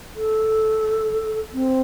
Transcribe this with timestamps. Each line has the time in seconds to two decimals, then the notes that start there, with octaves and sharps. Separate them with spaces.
0.16 A4
1.53 C4